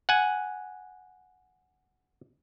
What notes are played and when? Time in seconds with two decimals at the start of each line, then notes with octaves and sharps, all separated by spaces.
0.09 F#5 G#5